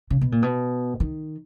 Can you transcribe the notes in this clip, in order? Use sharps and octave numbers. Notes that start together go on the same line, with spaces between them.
C#3
B2
A#2
B2
D#3